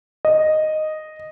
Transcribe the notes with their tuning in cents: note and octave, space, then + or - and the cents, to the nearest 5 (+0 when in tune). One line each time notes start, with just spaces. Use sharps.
D#5 -5